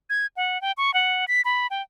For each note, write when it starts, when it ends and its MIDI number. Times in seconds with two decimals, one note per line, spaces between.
0.10 0.27 92
0.37 0.61 78
0.61 0.72 79
0.77 0.94 85
0.94 1.25 78
1.28 1.41 95
1.45 1.67 83
1.71 1.82 79